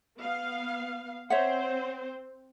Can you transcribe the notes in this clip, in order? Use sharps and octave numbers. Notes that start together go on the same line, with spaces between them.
B3 F5
C4 C5 C#5 E5 F#5